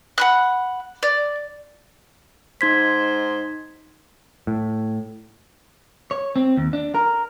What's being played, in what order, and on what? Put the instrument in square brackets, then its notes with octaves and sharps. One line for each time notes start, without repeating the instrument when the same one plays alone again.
[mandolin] F#5 B5 F#6
D5
[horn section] G#2 C5 [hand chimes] D#4 G#6 B6
[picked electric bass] A2
[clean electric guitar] C#5
C4
D#2
D4
A#4